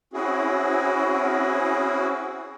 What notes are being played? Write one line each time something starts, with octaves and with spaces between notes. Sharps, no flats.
C4 C#4 E4 F#4 G#4